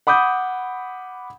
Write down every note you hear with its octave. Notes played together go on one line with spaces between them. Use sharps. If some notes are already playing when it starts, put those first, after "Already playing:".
F#5 B5 D6 D#6 G6